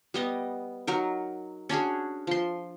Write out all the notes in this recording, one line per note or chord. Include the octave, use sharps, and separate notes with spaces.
G3 B3 D#5
F#3 D#4 A#4
C#4 D4 F#4 G#4
F3 C6